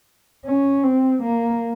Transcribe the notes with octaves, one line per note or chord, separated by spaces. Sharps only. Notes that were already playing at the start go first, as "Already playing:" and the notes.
C#4
C4
A#3